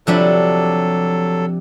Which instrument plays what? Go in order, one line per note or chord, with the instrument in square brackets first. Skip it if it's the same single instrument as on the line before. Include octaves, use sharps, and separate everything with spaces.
[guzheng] C3 D4 B5 [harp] F3 [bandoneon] F#3 A4